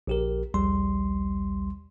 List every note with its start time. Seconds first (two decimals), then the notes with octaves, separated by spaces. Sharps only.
0.07 A#1 G4 A#4
0.54 A#1 D#2 G3 C6